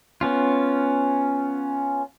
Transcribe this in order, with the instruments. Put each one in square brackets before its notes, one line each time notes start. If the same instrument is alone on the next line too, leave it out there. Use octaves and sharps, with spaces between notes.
[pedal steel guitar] B3 C#4 F4